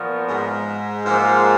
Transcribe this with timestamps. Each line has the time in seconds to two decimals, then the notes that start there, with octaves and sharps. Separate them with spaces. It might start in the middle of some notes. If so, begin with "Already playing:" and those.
Already playing: A#2 F3 B3 F#4 A#4
0.29 G#2
1.05 G#2 F3 A#3 F4 A#4